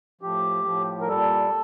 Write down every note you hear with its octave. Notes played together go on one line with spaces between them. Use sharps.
A2 F3 G4
A2 F3
A#4
A#2 G3 A4